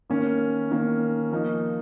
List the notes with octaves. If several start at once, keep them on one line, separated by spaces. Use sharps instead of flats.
D#3 A#3 C#4
D#3 A#3 C#4
F3 A#3 D#4